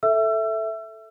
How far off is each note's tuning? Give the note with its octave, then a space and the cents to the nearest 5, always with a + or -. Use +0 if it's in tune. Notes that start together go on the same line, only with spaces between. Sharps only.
A4 +0 E5 +0 E6 +35